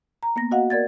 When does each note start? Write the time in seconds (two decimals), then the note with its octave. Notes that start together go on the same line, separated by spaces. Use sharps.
0.23 A#5
0.36 A#3 B3 A#6
0.51 F#4 D#5 F5 F#5
0.70 A#4 D5 G#6 A6